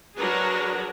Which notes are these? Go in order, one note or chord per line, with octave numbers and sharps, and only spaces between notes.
F#3 D4 F#4 G#4 A#4 B4